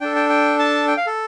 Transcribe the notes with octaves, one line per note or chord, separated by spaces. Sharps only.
D4 A4 G5
G5
G5
A5
G5
F5
A4